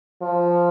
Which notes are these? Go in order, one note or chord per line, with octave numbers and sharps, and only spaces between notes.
F3